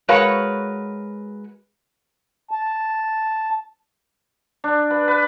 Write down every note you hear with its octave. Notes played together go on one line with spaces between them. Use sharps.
G#3 F#4 A#4 B4 C#5 F5
A5
D4
B4
B4